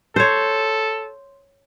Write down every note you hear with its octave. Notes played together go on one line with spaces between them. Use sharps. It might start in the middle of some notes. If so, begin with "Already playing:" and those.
A4 C5 C#5